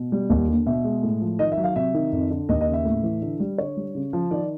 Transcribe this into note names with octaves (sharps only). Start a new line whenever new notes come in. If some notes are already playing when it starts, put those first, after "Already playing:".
Already playing: B2
G3
D#2
D3
B2 E5
G#3
A2
F3
D#3 D#5
E5
F#3
F5
C3 E5
D#3
F2
D3
D#2 D#5
D#5
C#3
E5
A2
E3
D3
G3
D3 C#5
G3
C#3
F3
D#3 D5